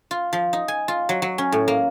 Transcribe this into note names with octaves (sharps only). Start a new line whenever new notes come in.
F4
F3
D#4
G#5
F4
F#3
F#3
C#4
A2
A#3